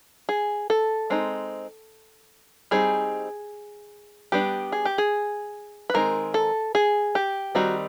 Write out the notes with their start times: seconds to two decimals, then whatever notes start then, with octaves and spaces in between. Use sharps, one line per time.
0.29 G#4
0.70 A4
1.10 G#3 C4 D#4
2.71 G3 C4 D#4 G#4
4.32 G3 B3 D4 G4
4.72 G#4
4.85 G4
4.98 G#4
5.90 B4
5.94 D#3 G#3 C4 D#4 A#4
6.34 A4
6.75 G#4
7.15 G4
7.55 D#3 G3 C4 D#4 F#4